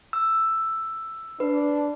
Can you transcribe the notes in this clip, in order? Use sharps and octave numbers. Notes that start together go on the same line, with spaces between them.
E6
D4 B4